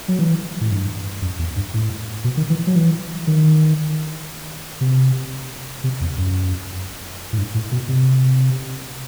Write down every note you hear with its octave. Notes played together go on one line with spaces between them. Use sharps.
F#3
E3
A2
G2
F#2
E2
G2
A2
B2
D#3
E3
F#3
E3
D#3
C3
C3
E2
F#2
A2
G2
A2
B2
C3